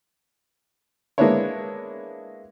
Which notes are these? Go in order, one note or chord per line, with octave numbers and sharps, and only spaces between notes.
G#3 A#3 B3 D4 E4 C#5